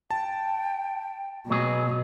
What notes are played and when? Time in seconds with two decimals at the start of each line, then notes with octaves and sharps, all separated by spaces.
0.11 G5 A5
1.50 B2 F#3 G#4